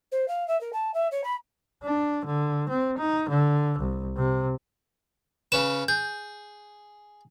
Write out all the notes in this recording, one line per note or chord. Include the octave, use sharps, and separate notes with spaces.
C5
F5
E5
A#4
A5
E5
C#5
B5
D4
D3
C4
D#4
D3
C2
C3
C#3 C#4 B4 E7
G#4 G6